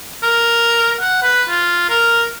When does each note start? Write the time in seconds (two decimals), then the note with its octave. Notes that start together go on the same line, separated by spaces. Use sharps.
0.23 A#4
1.00 F#5
1.22 B4
1.49 F4
1.89 A#4